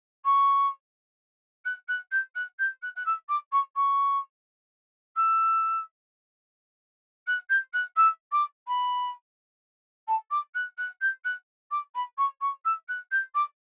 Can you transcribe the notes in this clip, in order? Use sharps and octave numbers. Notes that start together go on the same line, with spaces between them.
C#6
F#6
F#6
G6
F#6
G6
F#6
F#6
E6
D6
C#6
C#6
E6
F#6
G6
F#6
E6
D6
B5
A5
D6
F#6
F#6
G6
F#6
D6
B5
C#6
C#6
E6
F#6
G6
D6